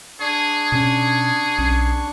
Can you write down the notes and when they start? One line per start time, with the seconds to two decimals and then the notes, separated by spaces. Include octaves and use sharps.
0.20 D4 G#4 C#6
0.72 B2 C#4 G#4
1.58 B1 C#4